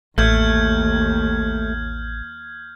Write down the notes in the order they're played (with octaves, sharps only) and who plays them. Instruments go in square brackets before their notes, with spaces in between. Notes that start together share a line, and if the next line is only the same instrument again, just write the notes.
[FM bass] A1 [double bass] D#2 [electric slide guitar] A3 [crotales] F6 G6 G#6